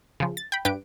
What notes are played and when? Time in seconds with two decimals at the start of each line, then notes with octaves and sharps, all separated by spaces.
0.20 C#3 F3
0.37 A6
0.52 G5 B5
0.65 G2 G4 B4 D7